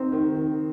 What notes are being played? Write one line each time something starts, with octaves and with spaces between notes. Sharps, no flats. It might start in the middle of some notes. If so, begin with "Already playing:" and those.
Already playing: C4 D#4
D#3
D#3